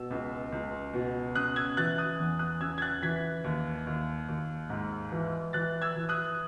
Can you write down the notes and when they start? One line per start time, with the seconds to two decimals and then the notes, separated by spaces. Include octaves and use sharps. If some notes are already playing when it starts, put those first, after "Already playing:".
Already playing: B2 E6
0.10 C#2
0.52 C#2
0.93 B2
1.35 C#3 D#6 F#6
1.56 E6 G#6
1.77 E3 F#6 A6
1.98 D#6 F#6
2.19 E2
2.39 D#6 F#6
2.60 C#3 E6 G#6
2.78 G#6
2.81 F#6 A6
3.02 E3 G#6 B6
3.44 D#2
3.87 D#2
4.29 D#2
4.70 G#2
5.12 E3
5.53 E3 F#6 A6
5.82 E6 G#6
5.96 E3
6.09 D#6 F#6